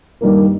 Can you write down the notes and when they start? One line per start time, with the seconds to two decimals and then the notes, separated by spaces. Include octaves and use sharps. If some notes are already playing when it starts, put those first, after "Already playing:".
0.21 G2 D#3 G3 A#3